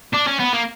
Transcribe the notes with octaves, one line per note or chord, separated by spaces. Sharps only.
D4
C#4
B3
A#3